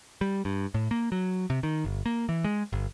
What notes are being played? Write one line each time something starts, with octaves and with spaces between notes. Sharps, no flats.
G3
G2
A2
A#3
F#3
C3
D#3
G1
A#3
E3
G#3
G1